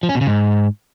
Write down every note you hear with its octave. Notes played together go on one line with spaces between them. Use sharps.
F3
C#4
B2
C#3
G#2